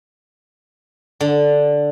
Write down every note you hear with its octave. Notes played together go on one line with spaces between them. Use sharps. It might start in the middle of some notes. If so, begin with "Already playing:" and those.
D3